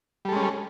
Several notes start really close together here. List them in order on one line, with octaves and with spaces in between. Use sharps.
G3 A4 G#3 C#4